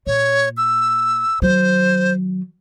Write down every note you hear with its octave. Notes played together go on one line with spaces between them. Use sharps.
A#2 C#5
E6
D#3 F#3 C5